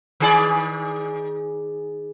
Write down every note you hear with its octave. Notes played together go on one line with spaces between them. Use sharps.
D#3 G#4 D5